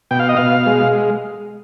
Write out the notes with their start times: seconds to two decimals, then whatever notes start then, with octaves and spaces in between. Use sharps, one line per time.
0.11 B2 G5
0.19 F5
0.29 D#5
0.36 B2 F5
0.66 G#3